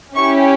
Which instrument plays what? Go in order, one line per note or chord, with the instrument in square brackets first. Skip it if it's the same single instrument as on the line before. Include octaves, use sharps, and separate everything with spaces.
[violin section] C#4 E4 G4 C#6